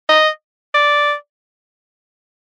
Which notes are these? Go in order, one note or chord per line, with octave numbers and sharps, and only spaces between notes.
D#5
D5